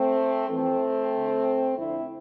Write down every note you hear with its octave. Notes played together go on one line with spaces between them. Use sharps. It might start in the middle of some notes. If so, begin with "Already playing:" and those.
Already playing: A3 C4
F2 E3 A3 C4
D2 D3
F2 D3 C4 E4